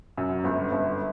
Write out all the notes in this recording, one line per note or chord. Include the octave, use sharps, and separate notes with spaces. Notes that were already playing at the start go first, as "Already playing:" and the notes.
F#2
G1
G1